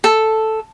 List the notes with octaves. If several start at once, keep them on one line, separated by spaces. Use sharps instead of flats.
A4